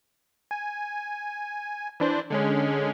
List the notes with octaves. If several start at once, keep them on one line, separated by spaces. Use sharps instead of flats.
G#5
E3 D4 C5
D3 G#3 C#4